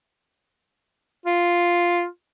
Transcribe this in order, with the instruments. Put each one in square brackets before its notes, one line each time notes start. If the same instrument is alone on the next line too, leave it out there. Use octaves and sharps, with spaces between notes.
[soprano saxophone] F4